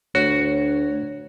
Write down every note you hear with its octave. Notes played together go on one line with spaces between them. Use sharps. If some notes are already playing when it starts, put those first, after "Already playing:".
D2 F#4 C#5